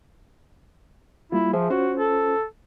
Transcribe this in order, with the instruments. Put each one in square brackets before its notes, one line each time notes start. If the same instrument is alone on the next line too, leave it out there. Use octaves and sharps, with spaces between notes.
[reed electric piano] G3 A#3 F4 [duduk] E4
[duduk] F3 [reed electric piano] G#4 C5 E5
[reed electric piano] C#4 F4 C5 [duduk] F#4
[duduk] A4